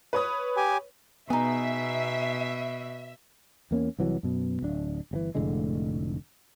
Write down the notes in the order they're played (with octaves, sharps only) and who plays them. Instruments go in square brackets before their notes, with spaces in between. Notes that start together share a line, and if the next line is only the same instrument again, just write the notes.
[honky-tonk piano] B4 C#5 D#6
[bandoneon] G4 G#5
[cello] B2 [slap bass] B3 [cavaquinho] D#4 G#4 [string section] E5
[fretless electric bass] E2 A#3 C#4
C2 E3 F#3
F#2 B2
D1 D4
G1 C#3 E3
F1 A2 D3 G#3